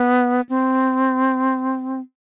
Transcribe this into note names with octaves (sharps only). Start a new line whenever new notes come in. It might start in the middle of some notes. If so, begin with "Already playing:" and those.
Already playing: B3
C4